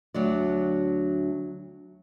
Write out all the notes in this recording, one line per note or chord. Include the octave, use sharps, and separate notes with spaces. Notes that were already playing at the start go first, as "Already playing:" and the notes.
D2 F#3 D4 D5